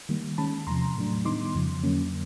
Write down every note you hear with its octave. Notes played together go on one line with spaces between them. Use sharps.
D#3 G3 A#3
D#3 G#3 C#4 A5 B5
E2 C3 F3 A#5 C6
A2 F#3 A3 D4
D#3 G3 B3 D#4 C6 D6
F2 C#3 F3
F2 D3 F#3 A#3 C#4